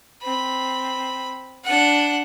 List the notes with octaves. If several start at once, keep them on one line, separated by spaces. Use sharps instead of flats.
C4 B5
D4 F#5